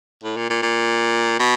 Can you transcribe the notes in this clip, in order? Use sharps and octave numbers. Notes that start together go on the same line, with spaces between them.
A2
A#2
A#2
A#2
B2